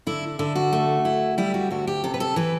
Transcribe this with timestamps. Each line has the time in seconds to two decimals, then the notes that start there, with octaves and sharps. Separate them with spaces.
0.07 D3 E4
0.39 D3 E4
0.55 F#4
0.73 A3
1.05 E4
1.38 G3 E4
1.54 F#4
1.71 D2 F#4
1.87 G4
2.04 C3 A4
2.14 B4
2.20 A4
2.36 E3 B4